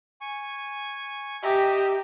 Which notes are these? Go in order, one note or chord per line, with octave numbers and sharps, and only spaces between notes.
G#5 C#6
G4 D#5 E5 A#5